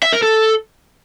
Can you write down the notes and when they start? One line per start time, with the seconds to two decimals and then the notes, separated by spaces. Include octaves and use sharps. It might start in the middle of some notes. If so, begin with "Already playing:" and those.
0.03 E5
0.13 A#4
0.22 A4